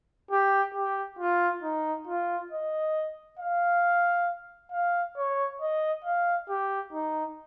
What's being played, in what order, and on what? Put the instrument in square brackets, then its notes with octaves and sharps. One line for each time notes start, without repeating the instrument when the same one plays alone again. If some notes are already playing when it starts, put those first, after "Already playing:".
[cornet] G4
G4
F4
D#4
F4
D#5
F5
F5
C#5
D#5
F5
G4
D#4